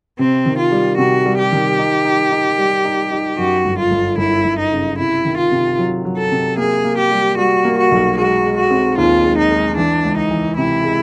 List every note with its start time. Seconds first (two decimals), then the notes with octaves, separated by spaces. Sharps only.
0.19 C3 C4
0.46 D#3
0.58 F4
0.72 G3
0.98 C3 F#4
1.26 G3
1.39 G4
1.52 D#3
1.79 D#4
2.05 D#4
2.32 D#4
2.58 G3
2.85 D#4
3.12 D#4
3.38 F#2 F#4
3.65 G1
3.78 F4
3.91 G1
4.18 G1 E4
4.45 G1
4.59 D#4
4.72 C#3
4.98 C3 E4
5.25 D#3
5.38 F4
5.51 C3
5.79 F#3
6.05 F#3
6.18 A4
6.32 C3
6.57 A#3 G#4
6.84 A#3
6.98 G4
7.11 G3
7.38 G3 F#4
7.65 A#3
7.78 F#4
7.91 B1
8.18 G#3 F#4
8.45 G#3
8.57 F#4
8.71 C4
8.98 D#2 F4
9.24 G#3
9.38 D#4
9.51 G#3
9.77 E3 D4
10.05 C#2
10.18 D#4
10.31 E3
10.57 C3 E4
10.84 G#3